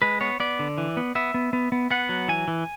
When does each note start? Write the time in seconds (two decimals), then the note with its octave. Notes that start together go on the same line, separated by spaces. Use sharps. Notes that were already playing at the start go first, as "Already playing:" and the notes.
0.02 G#3 B4
0.21 B3 C#5
0.40 B3 D5
0.59 D3
0.78 E3
0.97 B3
1.15 B3 E5
1.34 B3
1.53 B3
1.72 B3
1.91 B3 F#5
2.09 F#3
2.28 E3 G#5
2.48 E3